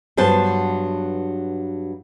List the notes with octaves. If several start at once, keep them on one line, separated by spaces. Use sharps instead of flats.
G2 F#3 B3 C5 A5